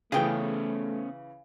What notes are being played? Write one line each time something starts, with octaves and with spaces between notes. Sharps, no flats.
C#3 E3 A3 B3 C#4 G#4 G5